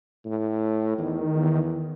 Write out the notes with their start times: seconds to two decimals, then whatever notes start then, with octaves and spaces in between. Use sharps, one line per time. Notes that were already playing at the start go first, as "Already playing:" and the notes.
0.25 A2
0.98 E2 D#3
1.35 E2